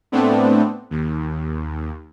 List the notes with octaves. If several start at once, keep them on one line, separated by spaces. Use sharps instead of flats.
A2 A3 B3 C4 D4
D#2